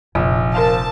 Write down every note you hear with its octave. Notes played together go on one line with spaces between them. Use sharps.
F1 A#1
A#4 C5 F5 A5